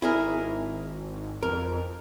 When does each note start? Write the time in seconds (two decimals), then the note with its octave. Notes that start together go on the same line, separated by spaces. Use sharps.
0.02 G#1 E4 G#4 A#4
1.43 F2 A#4